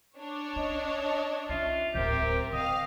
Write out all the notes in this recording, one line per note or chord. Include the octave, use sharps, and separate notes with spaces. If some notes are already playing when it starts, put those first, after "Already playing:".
D4 C#5
C#4 D#5
C#4 D#4 F4 E5
D1 G#1 C4 G4 A#4
D3 D#5 F5 G5